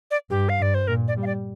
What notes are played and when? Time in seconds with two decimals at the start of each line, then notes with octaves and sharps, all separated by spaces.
0.11 D5
0.30 G2 G4
0.49 F5
0.59 G2 D5
0.74 C5
0.87 A#2 A#4
1.08 D5
1.17 G3
1.22 F5
1.27 D5